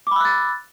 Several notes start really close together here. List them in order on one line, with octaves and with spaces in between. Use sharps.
D6 B5 E6 F#6 A6